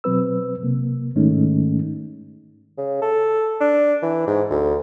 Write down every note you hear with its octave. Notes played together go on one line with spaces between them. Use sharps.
B2 F#3 C4 B4 E6
C3 A#3
G#2 D#3 G#3 A3 C#4 D#4
C#3
A4
D4
E3
G#2
D2